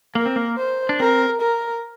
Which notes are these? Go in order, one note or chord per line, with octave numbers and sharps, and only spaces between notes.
A#3 A#4
C4
A#3
C5
D4
C4 A#4
A#4